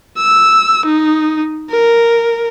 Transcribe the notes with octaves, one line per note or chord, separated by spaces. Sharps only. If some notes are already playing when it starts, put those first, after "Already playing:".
E6
D#4
A#4